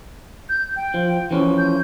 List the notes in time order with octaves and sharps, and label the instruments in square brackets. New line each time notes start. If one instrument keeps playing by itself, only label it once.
[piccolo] G6
G5
[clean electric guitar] F3
E3 F3 C#4
[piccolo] G6